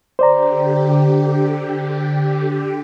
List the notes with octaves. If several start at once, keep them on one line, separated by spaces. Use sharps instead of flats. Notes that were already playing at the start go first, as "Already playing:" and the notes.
D3 G4 C5 D5 A#5